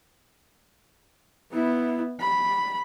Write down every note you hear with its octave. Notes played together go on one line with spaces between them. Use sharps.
B3 E4
B5